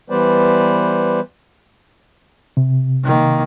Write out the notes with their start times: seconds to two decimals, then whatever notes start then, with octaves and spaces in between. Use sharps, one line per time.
0.10 E3 G3 B3 B4 C5 D5
2.57 C3
3.04 D#3 A#3